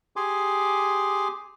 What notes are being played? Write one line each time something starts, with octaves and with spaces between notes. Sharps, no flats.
G4 G#4 G#5 C6 D6